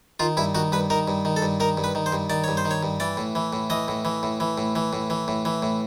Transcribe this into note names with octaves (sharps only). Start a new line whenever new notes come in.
D#3 F4
G2 E4
D#3 F#4
G2 B4
D#3 A#4
G2
D#3
A4
G2
D#3 A#4
G2
B4
D#3
C5
G2
D#3 D5
G2 C#5
C5
D#3
C#5
G2
E3 D5
A2
E3
A2
E3 D#5
A2
E3
A2
E3
A2
E3
A2
E3
A2
E3
A2